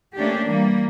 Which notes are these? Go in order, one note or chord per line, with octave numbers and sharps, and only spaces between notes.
A3 A#3 C#4 D4 G4
E3 G3 A#3